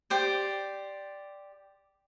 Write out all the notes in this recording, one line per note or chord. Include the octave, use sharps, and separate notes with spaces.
G4 C5 D5